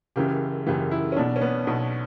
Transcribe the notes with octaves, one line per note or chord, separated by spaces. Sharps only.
F#1 F#2 C#3 E3 G4
F#1 F#2 C#3 E3 G4
E4
C#4
B1 B2 D4
C#4
B3
B1 B2